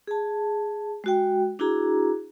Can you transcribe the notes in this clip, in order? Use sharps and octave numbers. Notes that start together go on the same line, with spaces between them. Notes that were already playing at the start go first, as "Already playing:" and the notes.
G#4 A5
G#3 F#4 G5
D4 E4 F#4 G#4 A#5